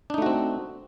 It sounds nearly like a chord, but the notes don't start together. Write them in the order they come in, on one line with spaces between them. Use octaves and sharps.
D4 D#4 A3 F#4 C4